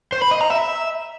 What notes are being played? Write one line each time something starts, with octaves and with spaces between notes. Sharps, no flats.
C5
B5
D#5
A#5
E5